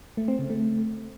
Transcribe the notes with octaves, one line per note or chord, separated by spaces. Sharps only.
A3
C4
C#3
A3